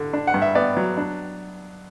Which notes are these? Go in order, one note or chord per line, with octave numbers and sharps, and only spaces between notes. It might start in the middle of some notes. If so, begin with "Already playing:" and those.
Already playing: D3
D4
F#5
G2
E5
B3 D5
F#3
D4